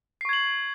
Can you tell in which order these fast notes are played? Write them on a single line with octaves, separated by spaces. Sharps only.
C7 C#6 G#6 F#7